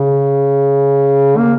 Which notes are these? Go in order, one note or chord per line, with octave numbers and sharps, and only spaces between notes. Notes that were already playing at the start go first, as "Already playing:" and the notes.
Already playing: C#3
A#3